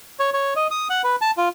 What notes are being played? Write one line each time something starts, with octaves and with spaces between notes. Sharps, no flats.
C#5
C#5
D#5
D#6
F#5
B4
A5
F4